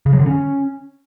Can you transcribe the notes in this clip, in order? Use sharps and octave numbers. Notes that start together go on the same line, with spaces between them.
C#3
F#3
D3
C#4